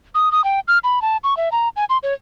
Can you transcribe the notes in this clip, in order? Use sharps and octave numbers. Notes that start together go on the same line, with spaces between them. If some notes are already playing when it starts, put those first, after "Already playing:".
D#6
D#6
G5
F6
B5
A5
C#6
E5
A#5
G#5
C6
C#5